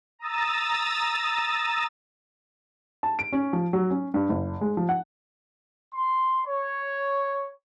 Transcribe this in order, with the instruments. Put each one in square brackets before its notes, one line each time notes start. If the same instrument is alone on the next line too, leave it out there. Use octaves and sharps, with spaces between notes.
[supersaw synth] A#5 D#6 E6 A6
[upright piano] A5
D7
C#4
F3
F#3
C#4
G2
F#1
G#3
F3
F#5
[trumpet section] C6
C#5